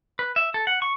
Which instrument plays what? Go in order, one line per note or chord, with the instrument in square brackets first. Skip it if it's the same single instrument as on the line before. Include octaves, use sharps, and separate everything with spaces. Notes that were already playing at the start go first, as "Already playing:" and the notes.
[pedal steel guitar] B4
E5
A4
F#5
C#6